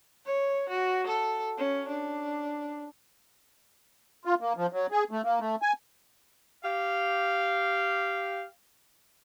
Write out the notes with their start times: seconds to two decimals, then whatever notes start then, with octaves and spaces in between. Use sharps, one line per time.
0.26 C#5
0.69 F#4
1.07 A4
1.58 C#4
1.88 D4
4.25 F4
4.41 A#3
4.57 F3
4.73 F#3
4.92 G#4
5.11 A3
5.24 A#3
5.40 A3
5.62 G#5
6.64 G4 F5